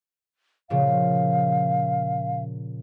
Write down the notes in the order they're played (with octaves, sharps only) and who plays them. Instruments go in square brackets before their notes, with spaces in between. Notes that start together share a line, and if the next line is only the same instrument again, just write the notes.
[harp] A#2 C#3 F3 [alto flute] F5